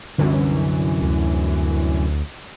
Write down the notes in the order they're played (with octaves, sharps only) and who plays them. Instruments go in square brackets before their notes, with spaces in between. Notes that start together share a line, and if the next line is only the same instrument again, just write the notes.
[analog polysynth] C2 F#2 E3 [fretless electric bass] D3 G3
[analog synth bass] D2